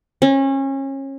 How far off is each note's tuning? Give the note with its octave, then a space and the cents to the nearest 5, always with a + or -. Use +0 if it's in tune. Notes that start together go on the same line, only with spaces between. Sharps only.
C#4 -30